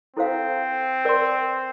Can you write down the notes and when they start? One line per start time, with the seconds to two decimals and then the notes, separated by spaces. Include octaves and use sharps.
0.16 C4 E4 A4 C5 F5
1.05 A#4 D5 G5 C6